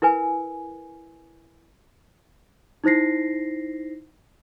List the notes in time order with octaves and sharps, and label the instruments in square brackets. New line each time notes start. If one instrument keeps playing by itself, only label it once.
[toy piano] E4 A#4 B4 G#5
[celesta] D#4 E4 C5 A#6 C7